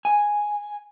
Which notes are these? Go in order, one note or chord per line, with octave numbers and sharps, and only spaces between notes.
G#5